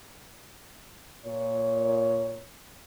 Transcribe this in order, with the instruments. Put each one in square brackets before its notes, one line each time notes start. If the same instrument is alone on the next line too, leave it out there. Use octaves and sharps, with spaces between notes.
[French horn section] A#2 C#5